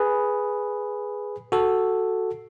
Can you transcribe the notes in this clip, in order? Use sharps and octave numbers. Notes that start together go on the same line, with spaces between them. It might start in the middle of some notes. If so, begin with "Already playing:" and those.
Already playing: G#4 B4
F#4 A4